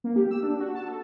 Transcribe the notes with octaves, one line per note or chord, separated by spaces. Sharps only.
A#3
G4
E6
D4
F#4
A5
A4